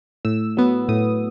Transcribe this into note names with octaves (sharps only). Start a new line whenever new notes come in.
A2 E6
F#3 B3
A2 D#6